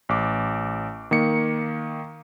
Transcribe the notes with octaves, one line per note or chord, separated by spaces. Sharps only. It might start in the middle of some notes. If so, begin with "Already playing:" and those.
A1 D6
D#3 A#3 C#7